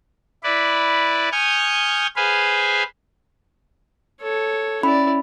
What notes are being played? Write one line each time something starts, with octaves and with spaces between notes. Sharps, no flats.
E4 B4 D5
G#5 C#6 D#6 F6 G6
G#4 B4 C5 F5 G#5
A4 C#5
C#4 E4 D5 B5